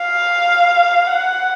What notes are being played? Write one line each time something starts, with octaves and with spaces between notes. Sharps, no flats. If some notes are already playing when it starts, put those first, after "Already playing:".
Already playing: F5
F#5